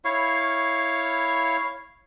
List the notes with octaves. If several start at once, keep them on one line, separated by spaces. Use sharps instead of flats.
E4 C#5 F5 C#6